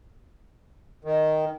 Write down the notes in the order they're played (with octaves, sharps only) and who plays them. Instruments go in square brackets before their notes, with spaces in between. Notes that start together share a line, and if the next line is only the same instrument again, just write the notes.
[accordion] D#3